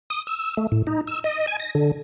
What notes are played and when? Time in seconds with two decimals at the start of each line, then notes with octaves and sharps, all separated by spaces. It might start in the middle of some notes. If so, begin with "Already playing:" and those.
0.10 D#6
0.27 E6
0.57 A3
0.72 A2
0.87 D#4
1.07 E6
1.24 D#5
1.47 G#5
1.60 A#6
1.75 D3